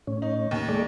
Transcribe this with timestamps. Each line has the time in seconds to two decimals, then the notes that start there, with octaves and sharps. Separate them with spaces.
0.07 A2 C#4
0.22 D#4
0.51 D#2
0.69 G#3 A3 D5